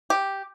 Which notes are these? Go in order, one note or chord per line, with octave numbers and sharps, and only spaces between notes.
G4